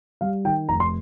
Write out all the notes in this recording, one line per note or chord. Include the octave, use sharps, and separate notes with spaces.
G3 F5
D#3 G5
F1 A#5
C6